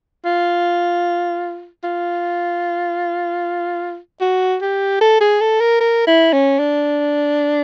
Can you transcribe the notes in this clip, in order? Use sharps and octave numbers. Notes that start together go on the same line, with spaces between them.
F4
F4
F#4
G4
A4
G#4
A4
A#4
A#4
E4
C#4
D4